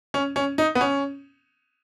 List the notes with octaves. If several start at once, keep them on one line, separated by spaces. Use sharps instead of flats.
C#4
C#4
D#4
B3
C#4